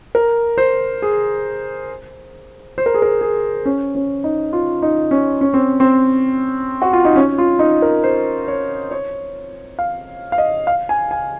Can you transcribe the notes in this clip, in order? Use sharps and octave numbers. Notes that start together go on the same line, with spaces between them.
A#4
C5
G#4
C5
A#4
G#4
A#4
G#4
C#4
C#4
D#4
F4
D#4
C#4
C#4
C4
C4
F#4
F4
D#4
C#4
F4
D#4
A#4
C5
C#5
C#5
F5
F5
D#5
F5
G#5
G#5